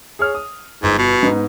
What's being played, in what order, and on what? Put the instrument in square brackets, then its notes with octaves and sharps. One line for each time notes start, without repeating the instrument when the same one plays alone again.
[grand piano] G#4 C#5 F6
D#6
[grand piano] G1 [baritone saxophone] G#2
[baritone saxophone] B2
[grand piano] G#2 B3 D#4